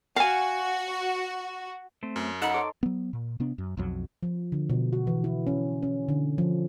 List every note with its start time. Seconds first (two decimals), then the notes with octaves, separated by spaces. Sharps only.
0.16 F#4 F5 G#5
2.03 A3 C4
2.16 F#2
2.42 D#4 A4 F#5 B5
2.54 A4 C5 C#5 D6
2.83 F#3 B3
3.13 A#2
3.40 C3 B3 D4
3.58 F#2
3.77 B1 F2 F#3
4.23 F3
4.52 D3
4.70 B2
4.93 F#4
5.07 E3
5.24 E4
5.47 C#4
5.83 C#4
6.09 D3
6.38 F3